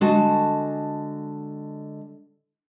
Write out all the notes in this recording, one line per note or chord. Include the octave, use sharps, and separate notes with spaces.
D3 G#3 F#4 G#5 A5